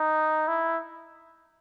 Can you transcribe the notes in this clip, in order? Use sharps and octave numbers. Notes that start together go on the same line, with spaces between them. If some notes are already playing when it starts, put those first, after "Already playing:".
Already playing: D#4
E4